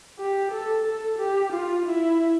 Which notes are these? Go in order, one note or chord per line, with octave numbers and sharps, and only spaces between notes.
G4
A4
A4
G4
F4
E4